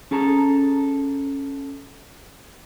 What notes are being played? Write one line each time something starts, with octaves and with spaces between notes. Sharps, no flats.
C#4 G#4 A4 A5 A#5